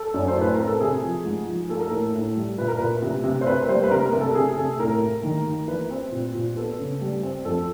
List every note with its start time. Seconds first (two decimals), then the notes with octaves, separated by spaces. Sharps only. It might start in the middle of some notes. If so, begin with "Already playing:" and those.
Already playing: A4
0.14 F#2
0.28 C5
0.36 A2 B4
0.54 C4 A#4
0.67 A4
0.80 C3 G#4
1.03 F3
1.25 G#2
1.47 F3
1.69 A#3 A4
1.79 A#4
1.89 A2 A4
2.13 A2
2.36 G3
2.58 A#2 B4
2.68 A#4
2.79 A#2 B4
3.02 C3
3.24 C3
3.41 C5
3.46 A#3 B4
3.69 G3 C5
3.83 B4
3.91 C3 A#4
4.06 A#4
4.13 C3
4.21 A4
4.35 C3 G#4
4.57 C3 A4
4.79 A2 A#4
5.02 A#3
5.23 D#3
5.46 A#3
5.68 E3 B4
5.90 C4
6.12 A#2
6.35 A#2
6.56 B3 A4
6.79 C#3
7.01 G3
7.23 C4
7.45 F2 A4